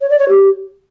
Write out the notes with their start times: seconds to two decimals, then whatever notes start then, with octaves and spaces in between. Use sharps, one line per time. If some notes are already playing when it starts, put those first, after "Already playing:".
0.01 C#5
0.10 D5
0.19 C#5
0.29 G4